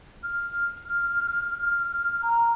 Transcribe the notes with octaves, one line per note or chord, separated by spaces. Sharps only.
F6
A#5